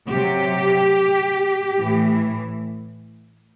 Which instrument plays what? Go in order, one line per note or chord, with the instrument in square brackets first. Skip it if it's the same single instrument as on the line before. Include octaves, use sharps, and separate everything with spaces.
[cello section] C3 F#3 G4
A2 E3